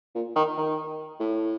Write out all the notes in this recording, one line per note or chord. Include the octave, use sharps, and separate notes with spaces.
A#2
D#3
D#3
A2